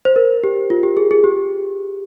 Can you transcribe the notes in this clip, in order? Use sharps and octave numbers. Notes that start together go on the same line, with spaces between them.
C5
A#4
G4
F4
G4
G#4
G#4
G4